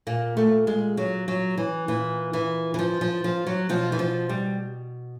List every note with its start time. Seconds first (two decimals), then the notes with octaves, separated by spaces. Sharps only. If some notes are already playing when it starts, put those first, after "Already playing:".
0.07 A#2 A#3
0.37 A3
0.67 G#3
0.97 F#3
1.28 F#3
1.58 E3
1.88 A#2 E3
2.33 E3
2.74 E3
2.79 F3
3.01 F3
3.24 F3
3.47 F#3
3.69 B2 F3
3.92 E3
3.99 F3
4.29 G3